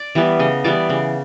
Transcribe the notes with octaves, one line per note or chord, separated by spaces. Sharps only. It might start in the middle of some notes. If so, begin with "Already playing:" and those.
Already playing: D5
E3 G3 B3
C#3 D#5
E3 G3 B3 D5
C#3